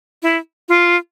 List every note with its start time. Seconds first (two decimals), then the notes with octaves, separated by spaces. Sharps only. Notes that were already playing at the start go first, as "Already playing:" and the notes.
0.23 E4
0.69 F4